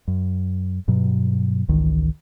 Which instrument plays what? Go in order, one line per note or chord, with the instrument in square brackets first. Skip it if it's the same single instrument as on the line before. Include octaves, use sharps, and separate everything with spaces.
[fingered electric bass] F#2
G2 B2 F#3
G#1 C#2 D#3 E3